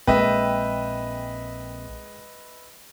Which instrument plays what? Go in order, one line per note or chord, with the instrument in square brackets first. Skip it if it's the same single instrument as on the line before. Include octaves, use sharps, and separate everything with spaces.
[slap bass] A#1 C4 [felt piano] G#3 A#3 G5 [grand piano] B4 D#5 E5